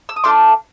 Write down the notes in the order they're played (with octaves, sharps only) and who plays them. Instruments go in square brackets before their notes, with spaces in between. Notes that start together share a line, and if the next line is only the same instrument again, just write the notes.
[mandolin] E6
D#6
A3 D4 F4 C6 D6